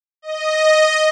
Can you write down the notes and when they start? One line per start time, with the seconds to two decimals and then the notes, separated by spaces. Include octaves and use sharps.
0.22 D#5